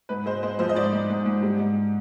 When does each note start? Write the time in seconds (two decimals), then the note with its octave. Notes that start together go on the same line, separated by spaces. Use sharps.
0.09 G#2 B4
0.26 G#3 C5
0.43 G#3 C5
0.59 F3 C5
0.69 D#5
0.76 G#2 D5
0.93 G#2
1.10 G#2
1.26 G#2
1.43 G3
1.60 G#2